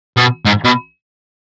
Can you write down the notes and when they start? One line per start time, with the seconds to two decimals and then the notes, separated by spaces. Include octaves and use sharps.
0.17 B2
0.45 G#2
0.65 B2